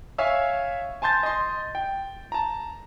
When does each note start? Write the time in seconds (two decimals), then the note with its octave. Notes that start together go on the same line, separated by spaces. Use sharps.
0.18 C#5 E5 F5 G#5 E6
1.02 G#5 A5 C6 G6 A6
1.23 D#5 C6
1.75 G5
2.32 A5 A#5